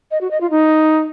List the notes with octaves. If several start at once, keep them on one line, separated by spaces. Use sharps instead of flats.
D#5
F#4
D#5
F4
D#4